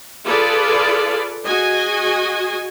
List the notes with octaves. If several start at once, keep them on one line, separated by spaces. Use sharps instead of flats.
F4 G#4 A4 B4 D5
F#4 G#4 D#5 G#5